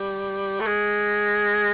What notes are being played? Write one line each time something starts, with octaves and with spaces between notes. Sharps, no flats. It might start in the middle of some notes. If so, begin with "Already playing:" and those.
Already playing: G3
A3
G#3